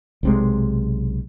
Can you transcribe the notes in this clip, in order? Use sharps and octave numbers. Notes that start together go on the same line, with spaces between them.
B1 C3 G#3